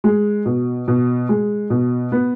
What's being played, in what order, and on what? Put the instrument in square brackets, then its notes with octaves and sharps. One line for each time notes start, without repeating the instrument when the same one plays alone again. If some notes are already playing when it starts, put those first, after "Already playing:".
[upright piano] G#3
B2
B2
G#3
B2
B3